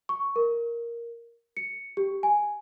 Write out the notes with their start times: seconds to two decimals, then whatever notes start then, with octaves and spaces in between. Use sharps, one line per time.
0.09 C#6
0.36 A#4
1.57 C#7
1.97 G4
2.23 G#5